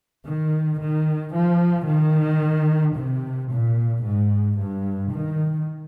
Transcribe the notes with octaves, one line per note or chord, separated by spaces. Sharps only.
D#3
D#3
F3
D#3
C3
A#2
G#2
G2
D#3